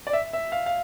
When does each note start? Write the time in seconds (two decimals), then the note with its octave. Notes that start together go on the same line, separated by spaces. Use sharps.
0.07 D5
0.13 E5
0.33 E5
0.52 F5
0.66 F5